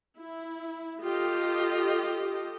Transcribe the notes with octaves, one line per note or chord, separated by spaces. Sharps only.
E4
F4 G4 A4 D#5